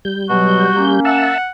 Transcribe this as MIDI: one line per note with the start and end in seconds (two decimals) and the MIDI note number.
0.05 1.00 55
0.05 1.00 91
0.30 0.67 47
0.30 0.67 54
0.30 0.93 66
0.77 1.31 58
0.77 1.31 61
1.05 1.38 76
1.05 1.51 78
1.05 1.38 81
1.05 1.38 88